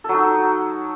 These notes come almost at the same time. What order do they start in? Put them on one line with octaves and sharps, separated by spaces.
A4 F#3 D#4